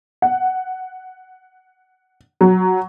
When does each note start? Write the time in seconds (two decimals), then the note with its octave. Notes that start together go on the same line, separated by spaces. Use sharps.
0.22 F#5
2.41 F#3